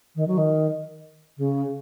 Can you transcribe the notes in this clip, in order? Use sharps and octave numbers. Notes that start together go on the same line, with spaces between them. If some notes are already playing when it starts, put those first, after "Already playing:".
D#3
F#3
D#3
C#3